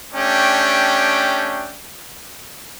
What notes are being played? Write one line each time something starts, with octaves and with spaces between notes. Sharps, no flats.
A3 C#4 D4 G4 G5